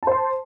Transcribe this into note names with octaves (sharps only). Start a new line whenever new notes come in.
C5 A5 C6